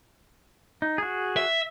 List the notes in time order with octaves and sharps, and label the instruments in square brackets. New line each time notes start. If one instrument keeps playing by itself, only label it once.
[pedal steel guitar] D#4
F#4 G#4
[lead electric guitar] E5